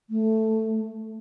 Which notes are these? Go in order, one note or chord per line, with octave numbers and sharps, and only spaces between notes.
A3